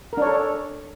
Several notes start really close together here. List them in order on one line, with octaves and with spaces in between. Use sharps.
A#4 D4 C#5 A4